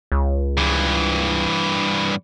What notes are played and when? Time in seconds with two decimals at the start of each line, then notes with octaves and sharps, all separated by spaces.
0.12 C#2
0.57 G2 E3